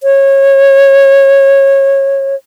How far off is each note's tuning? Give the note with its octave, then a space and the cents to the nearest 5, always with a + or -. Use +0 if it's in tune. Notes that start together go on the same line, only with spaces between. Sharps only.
C#5 -20